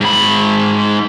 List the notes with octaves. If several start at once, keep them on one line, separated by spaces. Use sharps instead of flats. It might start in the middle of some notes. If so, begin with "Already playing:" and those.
G#2 B5